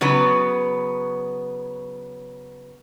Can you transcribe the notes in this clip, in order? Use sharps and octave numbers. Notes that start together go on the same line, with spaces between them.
C#3 F#3 B3 B4